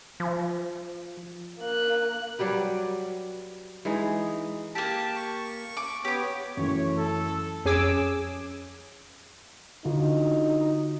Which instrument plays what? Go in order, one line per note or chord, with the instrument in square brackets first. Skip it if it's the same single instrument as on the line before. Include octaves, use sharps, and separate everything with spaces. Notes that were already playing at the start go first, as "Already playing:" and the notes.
[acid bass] F3
[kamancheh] A#3 F#6
[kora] F#3 G3 G4 B4
E3 G#3 D#4
[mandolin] A#3 G4 [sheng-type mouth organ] A5
[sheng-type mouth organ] C#6
[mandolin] D6
[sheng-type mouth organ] B3 C#5 [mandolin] G4 D6
[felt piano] F#2 E3 A3 [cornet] C#5
[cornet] A4
[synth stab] F2 C#4 G#4 G#5 D6 E6
[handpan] D3 F4 F#4 [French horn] D#4